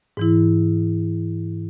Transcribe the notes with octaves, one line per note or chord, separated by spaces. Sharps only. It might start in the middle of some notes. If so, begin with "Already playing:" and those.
G#2 E3 E4